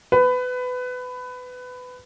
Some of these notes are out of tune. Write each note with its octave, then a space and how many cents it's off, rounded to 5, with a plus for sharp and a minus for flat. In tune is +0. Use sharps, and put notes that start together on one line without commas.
B4 +20